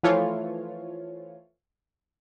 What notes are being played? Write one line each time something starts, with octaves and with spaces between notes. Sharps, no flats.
E3 F3 A3 F4 C#5